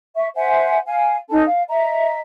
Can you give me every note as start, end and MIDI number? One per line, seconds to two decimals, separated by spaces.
0.15 0.27 76
0.15 0.27 85
0.35 0.78 72
0.35 0.78 76
0.35 0.78 78
0.35 0.78 80
0.86 1.15 77
0.86 1.15 80
1.29 1.42 61
1.29 1.42 63
1.29 1.42 69
1.29 1.42 81
1.46 1.62 77
1.69 2.18 75
1.69 2.18 76
1.69 2.18 82